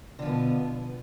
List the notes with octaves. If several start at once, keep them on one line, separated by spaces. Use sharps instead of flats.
B2 D3 F3 B3